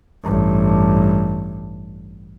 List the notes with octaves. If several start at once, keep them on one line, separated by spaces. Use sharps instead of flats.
A1 G2